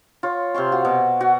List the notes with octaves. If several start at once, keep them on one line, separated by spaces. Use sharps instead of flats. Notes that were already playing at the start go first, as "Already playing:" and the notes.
F4 C#5
C3 F5 C6 C#6
F#4
B2
F#4